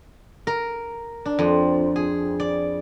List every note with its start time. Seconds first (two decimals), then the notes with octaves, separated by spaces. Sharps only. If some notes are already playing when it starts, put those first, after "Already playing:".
0.47 A#4
1.25 D4
1.39 F2
1.96 G#4
2.40 D5